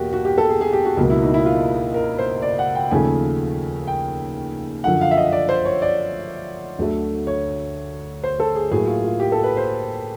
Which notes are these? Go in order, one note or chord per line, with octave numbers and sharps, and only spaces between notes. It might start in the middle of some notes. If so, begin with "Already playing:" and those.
Already playing: E2 B2 A#3 F#4 G4
F#4
G4
A4
G#4
G#4
G4
F#4
C#2 B2 F#3 A#3
E4
D#4
E4
F4
A#4
C5
D5
F#5
G5
D#2 C#3 F3 A3 G#5
G5
F#2 D3 F3 F#5
F5
E5
D#5
D5
C5
C#5
D5
D2 D3 F#3 A3
C#5
C5
A4
G#4
A2 F#3 A#3 G#4
F4
F4
G4
A4
B4
C5